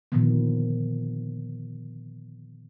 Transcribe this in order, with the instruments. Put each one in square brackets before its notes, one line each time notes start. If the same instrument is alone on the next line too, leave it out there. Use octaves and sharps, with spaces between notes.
[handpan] A#2 D3 D#3 F3 B3